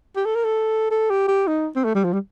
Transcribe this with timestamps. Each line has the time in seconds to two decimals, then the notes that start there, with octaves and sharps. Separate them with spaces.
0.16 G4
0.25 A4
0.35 A#4
0.44 A4
0.91 A4
1.10 G4
1.28 G4
1.47 D#4
1.76 C4
1.85 A3
1.95 G3
2.04 F3
2.13 G3